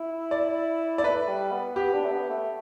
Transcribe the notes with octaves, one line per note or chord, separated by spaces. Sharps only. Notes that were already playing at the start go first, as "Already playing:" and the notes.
Already playing: E4
D5
D5
A3 B4
G3
B3
B3 G4
D4
A3
B3
A3